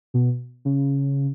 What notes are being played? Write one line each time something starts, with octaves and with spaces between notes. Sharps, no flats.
B2
C#3